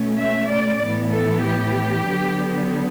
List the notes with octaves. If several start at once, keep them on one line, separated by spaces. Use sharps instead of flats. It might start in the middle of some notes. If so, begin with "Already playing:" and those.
Already playing: B2 A3 C#4
E5
D5
A2 E3 B3
A4
G4
D3 F#3 B3